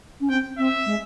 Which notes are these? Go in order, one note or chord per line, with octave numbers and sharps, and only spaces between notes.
C#4
C4 G5
C4 E5
G#3